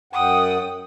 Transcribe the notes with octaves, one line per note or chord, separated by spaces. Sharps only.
F#2 F#5 G5 D#6